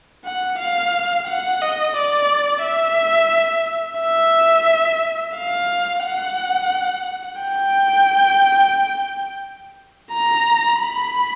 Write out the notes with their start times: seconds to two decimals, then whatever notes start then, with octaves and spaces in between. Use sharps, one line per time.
0.25 F#5
0.59 F5
1.27 F#5
1.61 D#5
1.96 D5
2.63 E5
4.00 E5
5.36 F5
6.04 F#5
7.41 G5
10.12 A#5
10.81 B5